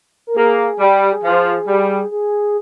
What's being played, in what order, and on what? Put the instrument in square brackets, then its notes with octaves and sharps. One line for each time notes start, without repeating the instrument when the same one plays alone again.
[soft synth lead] A#4
[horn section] A#3 [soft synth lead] G#4
[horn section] G3
[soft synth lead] G4
G4
G#4
[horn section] F3
G3
[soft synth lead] G#4